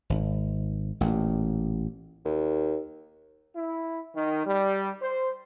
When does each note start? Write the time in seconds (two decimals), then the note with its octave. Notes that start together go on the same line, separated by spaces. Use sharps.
0.10 G#1
1.01 A1 A#2
2.25 D#2
3.56 E4
4.15 D#3
4.45 G3
5.03 C5